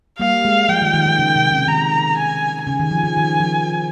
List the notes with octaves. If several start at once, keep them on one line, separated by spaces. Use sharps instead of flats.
G3 A#3 F5
G#3
F3 G5
D#3
D#3
D#3
C#3
C3
C#3
D#3 A#5
G#5
C#3 G#5
D#3
F3
D#3
D#3
F3